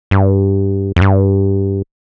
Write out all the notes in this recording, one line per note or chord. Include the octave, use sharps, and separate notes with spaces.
G2
F2
G2